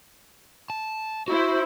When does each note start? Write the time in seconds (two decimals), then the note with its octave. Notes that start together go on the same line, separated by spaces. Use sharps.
0.70 A5
1.28 E4 F#4 C5